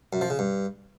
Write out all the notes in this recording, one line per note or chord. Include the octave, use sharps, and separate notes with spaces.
F#2
F3
C#3
G2